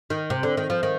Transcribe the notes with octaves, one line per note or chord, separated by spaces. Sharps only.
D#3
C3
D3
D#3
F3
D#3